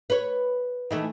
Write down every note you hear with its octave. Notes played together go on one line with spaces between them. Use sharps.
B4 C#5
D#3 E3 A3